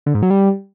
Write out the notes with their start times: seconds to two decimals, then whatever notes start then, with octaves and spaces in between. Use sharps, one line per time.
0.06 D3
0.14 G#2
0.22 F#3
0.30 G3